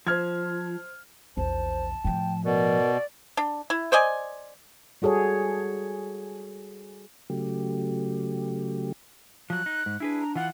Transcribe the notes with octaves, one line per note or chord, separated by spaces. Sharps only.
F3 C5 F6 G#6
A#1 E2 C5 A5
A2 F3 G5
B2 A#4 D5
D4
E4
C5 D5 D#5 G#5
G3 F#4 G#4 A4 C#5
C#3 F#3 A3 G4
F3 F#3 F#6
D#4
G#2
D4 E4 G#4 B4
A#5
E3 F4 F#5